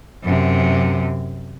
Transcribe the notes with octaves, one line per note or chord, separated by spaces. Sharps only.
F#2 C3